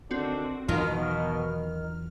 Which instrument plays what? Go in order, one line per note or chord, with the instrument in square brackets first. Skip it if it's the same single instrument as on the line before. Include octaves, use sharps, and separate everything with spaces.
[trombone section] D3 D#3 D4 [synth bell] C4 F#4
[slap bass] E2 F#3 [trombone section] B2 [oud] D#3 F4 [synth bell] F6